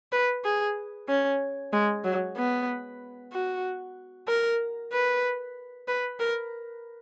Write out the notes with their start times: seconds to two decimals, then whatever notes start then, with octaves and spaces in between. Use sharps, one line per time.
0.12 B4
0.44 G#4
1.08 C#4
1.73 G#3
2.04 F#3
2.37 B3
3.33 F#4
4.28 A#4
4.92 B4
5.88 B4
6.19 A#4